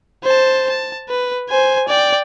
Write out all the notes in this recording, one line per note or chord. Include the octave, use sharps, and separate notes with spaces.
C5 A5
A5
B4
C5 G#5
D5 G5